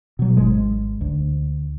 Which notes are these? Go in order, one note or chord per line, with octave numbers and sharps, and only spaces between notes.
B2 F#3
G#1 G#2 G#3
D2